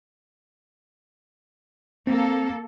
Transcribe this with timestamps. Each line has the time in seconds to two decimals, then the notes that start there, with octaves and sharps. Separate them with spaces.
2.07 A#3 C4 A4